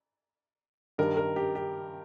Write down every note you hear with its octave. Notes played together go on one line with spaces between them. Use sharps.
G2 D#3 G3 A#4
A#4
G4
G4